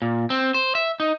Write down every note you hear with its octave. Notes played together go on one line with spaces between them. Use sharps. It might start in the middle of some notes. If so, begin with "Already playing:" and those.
A#2
C4
C5
E5
D#4